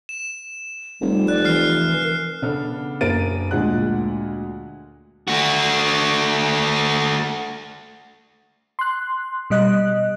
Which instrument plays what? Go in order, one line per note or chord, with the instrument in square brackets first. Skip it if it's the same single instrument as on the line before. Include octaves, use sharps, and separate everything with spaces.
[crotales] E7
[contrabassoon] F1 [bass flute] G3
[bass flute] D5 [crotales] F#6
[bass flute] E3 [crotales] F6 C7
[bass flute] A#4
[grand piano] C#3 B3 D4 A4 F6
F#1 D4 A#4 A6 D7 D#7
D2 A#2 G#3 D4 F#5 F#6
[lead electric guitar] A3 F#4
[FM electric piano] C6 F#6
B2 G3 D#5 F#6